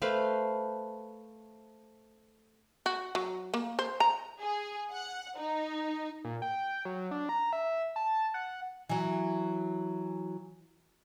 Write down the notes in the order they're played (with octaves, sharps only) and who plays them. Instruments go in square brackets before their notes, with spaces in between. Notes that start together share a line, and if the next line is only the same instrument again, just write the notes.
[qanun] A3 B4 C5 F5
[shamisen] F#4
F#3
A#3
C5
A#5
[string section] G#4
F#5
D#4
[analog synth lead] A#2
G5
F#3
D4
A#5
E5
A5
F#5
[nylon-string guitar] E3 F#3